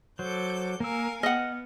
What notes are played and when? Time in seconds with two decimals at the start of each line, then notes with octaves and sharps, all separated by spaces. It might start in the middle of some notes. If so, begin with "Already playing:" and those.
0.19 F#3 A4 C5 D6 G6
0.80 A#3 A#4 F5 G#5 E6
1.23 B3 D#5 F#5 F6